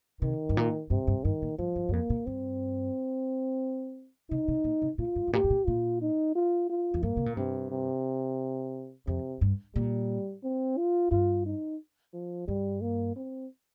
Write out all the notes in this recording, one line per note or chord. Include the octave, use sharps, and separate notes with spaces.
C3 D#3
G2
A#2
G2 C3
G2
G2 D#3
A#2
G2 F3
G2
G2
F2 A#3
A#2
G2 C4
C3 D#4
C3
A#2
C3
A#2 F4
G2
G2
A#2 G4
G2
A#2
A#2 F4
D#4
F4
F4
F2
G2 A#3
C3
A#2
G2 C3
C3
F2 C3
G2
A#2 G3
C4
F4
G2 F4
D#4
F3
G2 G3
A#3
C4